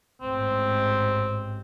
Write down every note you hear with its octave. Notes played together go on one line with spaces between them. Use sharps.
A1 G#2 C4